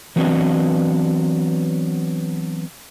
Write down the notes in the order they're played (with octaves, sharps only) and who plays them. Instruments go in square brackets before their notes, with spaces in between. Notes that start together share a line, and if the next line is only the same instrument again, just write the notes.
[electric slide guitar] E3 F#3 B3 C4 D4 D#5